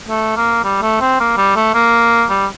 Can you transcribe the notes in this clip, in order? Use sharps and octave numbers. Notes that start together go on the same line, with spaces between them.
A3
A#3
G3
A3
C4
A#3
G3
A3
A#3
G3